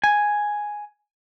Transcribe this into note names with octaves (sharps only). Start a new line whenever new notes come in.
G#5